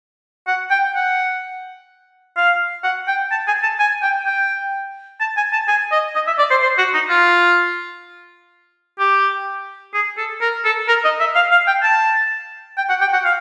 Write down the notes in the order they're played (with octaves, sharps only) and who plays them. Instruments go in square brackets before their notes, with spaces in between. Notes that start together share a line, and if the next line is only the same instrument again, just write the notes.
[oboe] F#5
G5
F#5
F5
F#5
G5
A5
G#5
A5
G#5
G5
G5
A5
G#5
A5
G#5
D#5
D#5
E5
D5
C5
C5
F#4
D#4
F4
G4
G#4
A4
A#4
A4
A#4
D#5
E5
F5
F5
G5
A5
G5
F#5
G5
F#5
F5